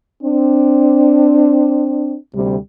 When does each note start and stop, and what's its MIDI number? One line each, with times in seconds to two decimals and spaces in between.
0.23 2.16 60
0.23 2.16 62
2.34 2.57 38
2.34 2.57 48
2.34 2.57 55